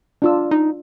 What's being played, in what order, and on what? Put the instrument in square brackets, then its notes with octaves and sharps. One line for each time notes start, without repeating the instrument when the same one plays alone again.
[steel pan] D4 F4 E6
[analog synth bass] D#4